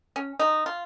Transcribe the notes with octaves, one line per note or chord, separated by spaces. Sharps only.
C#4
D#4
F4